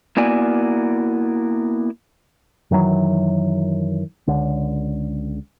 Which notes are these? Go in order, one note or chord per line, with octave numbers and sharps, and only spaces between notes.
A#3 B3 E4 F#4 D5 G#5
F#2 D#3 E3 F#3
C#2 D3